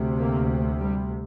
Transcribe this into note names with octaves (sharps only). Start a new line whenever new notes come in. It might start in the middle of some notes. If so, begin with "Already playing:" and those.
Already playing: D2 C3
A#3
G3